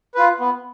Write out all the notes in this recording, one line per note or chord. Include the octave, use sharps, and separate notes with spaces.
F4 B4
B3